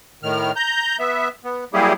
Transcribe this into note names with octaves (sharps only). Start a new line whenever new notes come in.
A2 D#3 F6
A#5 G6
B3 E5
B3
F#3 G3 A#3 E4 G4 G#4